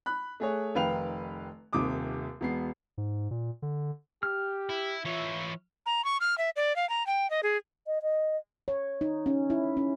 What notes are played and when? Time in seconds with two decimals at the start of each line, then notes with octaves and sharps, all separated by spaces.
0.06 B5 F#6
0.40 A3 G#4 C#5
0.75 F1 D#3 B4 F5 G5 F7
1.73 D#1 D#2 C3 D6 D#6
2.41 E1 B3 C7
2.98 G#2
3.31 A#2
3.62 D3
4.23 G4 F6
4.70 E4
5.05 E3 F4 C#5 E5
5.86 A#5
6.04 C#6
6.20 F6
6.38 E5
6.56 D5
6.76 F5
6.89 A#5
7.06 G5
7.30 D#5
7.43 G#4
7.87 D#5
8.02 D#5
8.68 C#5
9.01 D#4
9.26 C#4
9.50 E4
9.77 C#4